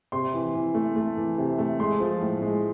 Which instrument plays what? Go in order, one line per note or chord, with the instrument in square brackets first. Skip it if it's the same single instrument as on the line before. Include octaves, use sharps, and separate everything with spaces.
[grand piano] C3 C6
E3
E3
A3
A3
E3
C3
A3
G#3 C6
F3
A2
G#3